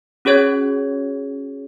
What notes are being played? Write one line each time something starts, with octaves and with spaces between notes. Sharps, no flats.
C#4 F#4 G#4 C#5 G#6